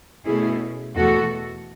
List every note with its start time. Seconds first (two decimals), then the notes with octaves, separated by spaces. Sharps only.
0.25 B2 A3 C#4 E4 G#4
0.96 E2 B2 A3 F#4 A4